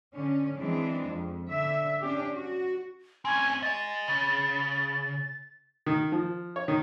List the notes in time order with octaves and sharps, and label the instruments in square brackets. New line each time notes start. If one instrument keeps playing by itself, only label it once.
[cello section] D3 C#4
E3 G#3 C4 D4
F2
D3 E5
C#4 D4 G4
F#4
[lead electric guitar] C4 C#4 [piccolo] G#5
[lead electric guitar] D#5 G#5 [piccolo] A6
[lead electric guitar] C#3
[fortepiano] D#3
F3
C#5
D#3